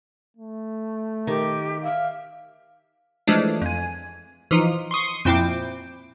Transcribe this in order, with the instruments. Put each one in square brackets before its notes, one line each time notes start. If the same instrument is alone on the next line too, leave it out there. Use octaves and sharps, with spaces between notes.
[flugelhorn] A3
[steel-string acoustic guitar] D#3 [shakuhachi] G4
[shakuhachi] E5 [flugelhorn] F5
[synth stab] E3 F3 G#3 A3 D4
F2 G#5
E3 F3 D#4 F4
C6 C#6 D#6 C7
F2 A#2 C4 E4 G5 D6